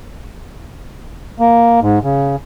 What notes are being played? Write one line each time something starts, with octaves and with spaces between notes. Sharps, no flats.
A#3
G#2
C#3